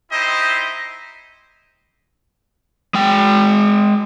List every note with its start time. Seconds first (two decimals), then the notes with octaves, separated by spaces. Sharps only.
0.12 D#4 E4 G4 C5 D#5 E5
2.94 G#3 G5